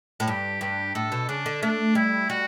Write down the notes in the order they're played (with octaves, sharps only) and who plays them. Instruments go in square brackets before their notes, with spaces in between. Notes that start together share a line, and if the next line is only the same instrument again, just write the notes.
[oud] A2
[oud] G2 [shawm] G4
[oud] G2 [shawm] G4
[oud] A2 [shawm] A4
[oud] B2
[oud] C#3 [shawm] D4
[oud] D3
[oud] A3 [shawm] D4
[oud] G3 [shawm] E4
[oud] G3 [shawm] F#4